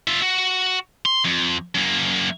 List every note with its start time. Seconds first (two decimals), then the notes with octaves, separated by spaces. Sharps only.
0.08 F4 E5
0.22 F#4
1.06 C6
1.25 F2
1.75 F#2 A#3